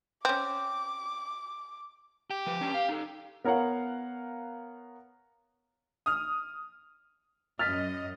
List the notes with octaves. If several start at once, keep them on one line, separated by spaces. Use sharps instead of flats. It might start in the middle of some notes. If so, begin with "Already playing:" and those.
C4 C#4 D6
G4
F3 B4
C#4 D4 B4
F5
D#4 A4
B3 A#4 C#5 F5 F#5
D#6 F6
F#2 D#5 F6 A6 B6